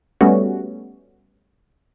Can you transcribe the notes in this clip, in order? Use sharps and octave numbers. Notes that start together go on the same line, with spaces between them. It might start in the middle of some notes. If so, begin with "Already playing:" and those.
G3 A3 B3 C#4 F#4